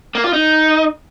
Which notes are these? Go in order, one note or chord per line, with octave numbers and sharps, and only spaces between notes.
A#3
F4
D#4